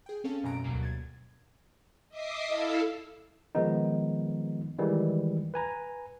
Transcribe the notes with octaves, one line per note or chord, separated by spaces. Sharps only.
G#4 G5
C4 C#4 A4 F5 A5
A1 F#2 B2 G#5 A#5 D7
D2 G2 B2 F#3 A#3
G#6 A6
D#5 E5 D6 D#6 C7
E4 A4 E5 F5
D#3 F3 G#3 B3 D#4
D#3 E3 G3 G#3
B4 G#5 A#5